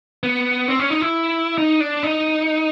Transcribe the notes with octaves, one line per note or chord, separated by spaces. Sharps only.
B3
C4
C#4
D#4
E4
D#4
D4
D#4